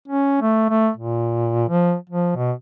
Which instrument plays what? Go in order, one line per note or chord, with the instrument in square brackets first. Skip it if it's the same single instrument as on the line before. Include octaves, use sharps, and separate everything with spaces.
[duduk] C#4
A3
A3
A#2
F3
F3
B2